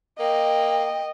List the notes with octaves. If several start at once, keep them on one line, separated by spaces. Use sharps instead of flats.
A#3 D#5 G5